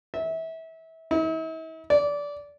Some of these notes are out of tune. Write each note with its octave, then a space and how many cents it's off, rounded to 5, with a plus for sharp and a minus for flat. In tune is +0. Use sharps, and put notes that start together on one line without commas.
E5 -25
E4 -45
D5 -20